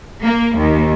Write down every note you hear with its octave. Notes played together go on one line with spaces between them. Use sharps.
A#3
D#2